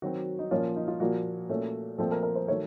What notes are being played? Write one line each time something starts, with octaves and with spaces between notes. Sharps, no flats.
D#3 F#3 C4 F#4
D#4
A#2 F3 A#3 C#4 F4
D#4
F4
A#2 F3 A#3 F#4
A#2 A3 C#4
A#2 F3 A3 C4 A4
A#4
A#4
C5
D#3 F#3 A3 C#5